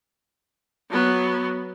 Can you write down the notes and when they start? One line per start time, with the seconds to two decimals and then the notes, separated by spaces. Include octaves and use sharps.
0.90 F#3 B3